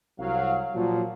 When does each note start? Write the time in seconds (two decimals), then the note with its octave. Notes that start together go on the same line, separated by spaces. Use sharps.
0.19 C2 F#3 F5
0.74 A#2 F3 F#3